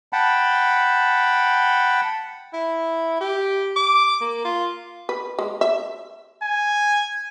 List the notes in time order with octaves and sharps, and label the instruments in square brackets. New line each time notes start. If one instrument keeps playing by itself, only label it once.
[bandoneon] F#5 G5 A5 B5
[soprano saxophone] E4
G4
D6
A#3
F4
[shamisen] B4
G#3
E5
[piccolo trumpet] G#5